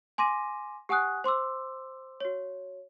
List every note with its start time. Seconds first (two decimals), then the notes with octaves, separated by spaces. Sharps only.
0.18 G#5 C6 D6 A#6 D#7
0.89 G4 F#5 G#5 D#6 F#6
1.24 C5 C6 D6 E6
2.20 F#4 C#5